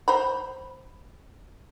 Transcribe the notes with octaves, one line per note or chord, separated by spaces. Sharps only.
C5 A#5 B5